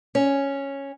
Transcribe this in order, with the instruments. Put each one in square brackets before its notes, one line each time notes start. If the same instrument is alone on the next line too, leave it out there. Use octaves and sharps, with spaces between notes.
[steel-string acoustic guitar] C#4